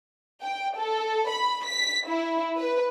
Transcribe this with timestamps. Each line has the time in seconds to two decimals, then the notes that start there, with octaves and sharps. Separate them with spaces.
0.42 G5
0.76 A4
1.29 B5
1.66 B6
2.08 E4
2.58 B4